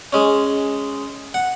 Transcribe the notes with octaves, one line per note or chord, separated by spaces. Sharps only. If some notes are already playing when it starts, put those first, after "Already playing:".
G#3 C#4
F#5